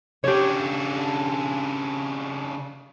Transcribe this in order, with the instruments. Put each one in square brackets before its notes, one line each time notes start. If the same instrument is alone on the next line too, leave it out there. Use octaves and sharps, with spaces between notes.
[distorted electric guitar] C#3 D4 [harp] G4 C#5